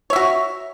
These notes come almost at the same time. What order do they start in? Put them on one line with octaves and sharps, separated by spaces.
C#5 E5 F#4